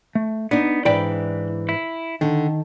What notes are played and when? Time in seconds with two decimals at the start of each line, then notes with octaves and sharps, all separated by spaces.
0.15 A3
0.51 B3 D4 D#4
0.85 G#2 E3 E4 D5 G5 B5
1.69 E4
2.21 D3 D#3